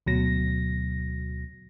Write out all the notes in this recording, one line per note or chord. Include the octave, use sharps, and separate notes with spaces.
D2 B2 F#3 A#6